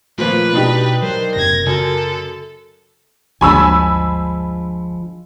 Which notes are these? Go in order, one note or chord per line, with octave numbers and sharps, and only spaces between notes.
A#2 F3 A3 A#3 F4 B4
B2 D4 D#4 G4
F#3 A#4 C5
F#1 F#2 C3 G#6 A#6
F#2 C#3 A4
G1 D2 F3 G#3 D4 G#5 B5 E6